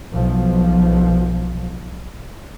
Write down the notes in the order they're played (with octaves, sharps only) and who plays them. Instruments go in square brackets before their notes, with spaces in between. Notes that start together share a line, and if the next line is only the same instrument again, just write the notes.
[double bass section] B1 F3